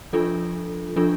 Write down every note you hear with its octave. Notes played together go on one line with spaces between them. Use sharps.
F3 D4 F4 A4
F3 D4 F4 A4